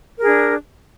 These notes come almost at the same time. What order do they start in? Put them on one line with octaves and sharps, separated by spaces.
A#4 G#4 D4